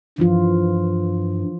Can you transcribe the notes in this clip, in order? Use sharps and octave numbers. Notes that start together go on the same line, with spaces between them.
G2 E3 F3 F4